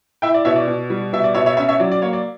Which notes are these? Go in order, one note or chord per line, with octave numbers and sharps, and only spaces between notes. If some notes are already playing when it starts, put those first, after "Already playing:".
E4 E5 G5
D5
B2 C#5 E5
D5
B2
G3
B2 E5
D5
B2 C#5 E5
C#5 E5
C#4 C#5 E5
C#5 E5
F#3 D5
D5
A#3 C#5
D5